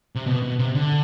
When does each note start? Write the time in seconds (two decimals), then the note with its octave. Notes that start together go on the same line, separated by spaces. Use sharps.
0.15 C3
0.26 B2
0.42 B2
0.59 C3
0.75 D3